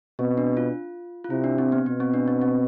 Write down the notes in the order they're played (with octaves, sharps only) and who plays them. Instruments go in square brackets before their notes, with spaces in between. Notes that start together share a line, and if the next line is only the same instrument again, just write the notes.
[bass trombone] B2 [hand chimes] C4
[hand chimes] D4
F4
F4
[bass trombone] C3 [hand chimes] E4
[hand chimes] D4
C4
B3
[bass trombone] B2 [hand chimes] B3
[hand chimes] C4
D4
C4
C4